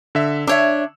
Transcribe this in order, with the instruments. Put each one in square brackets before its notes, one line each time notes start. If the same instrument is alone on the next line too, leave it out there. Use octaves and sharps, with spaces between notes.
[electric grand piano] D3 E5
[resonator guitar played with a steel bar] D4 C#5 E5 [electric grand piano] E6